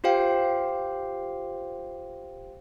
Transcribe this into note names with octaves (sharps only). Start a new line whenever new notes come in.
F4 G4 C5 F5 G5